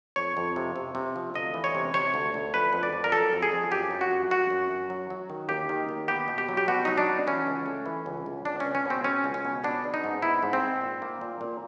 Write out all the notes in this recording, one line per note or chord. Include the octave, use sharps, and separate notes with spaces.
F2 C#5
F2
C3
C3
C3
F3
D2 D#5
E3
C#5
C3
C3 C#5
D2
D2
F2 B4
F2
D5
F2
A#4
F#3 A4
F2
G#4
F2
F#2 G4
F#3
F#4
F#2
F#2 F#4
F#2
F#2
F#3
F#3
D#3
D#2 G4
D#3
D#2
B3 G4
B2
G4
F#3
G4
B2 F#4
F#3 D#4
D4
B3
E3 C#4
C#2
A3
E3
C#2
C#2
C#2 D4
C#2 C#4
C#4
B2
C4
G#3 C#4
C#2
C#4
B2
B3 D4
G#3
D#4
G#2
B3 E4
G#2
C4
G#2
A#2
A#3
A#2
A#2